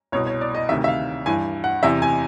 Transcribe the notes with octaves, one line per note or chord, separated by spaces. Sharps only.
C2 B2 C#5
C#5
D5
D#5
D2 C3 D#3 E5
E5
F5
G2 E3 G#5
F#5
E2 C3 E3 E5
G#5